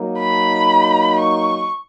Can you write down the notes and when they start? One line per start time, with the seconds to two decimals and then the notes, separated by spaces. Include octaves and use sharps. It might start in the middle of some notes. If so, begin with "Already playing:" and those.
Already playing: F#3 A#3 D#4
0.19 B5
1.19 C#6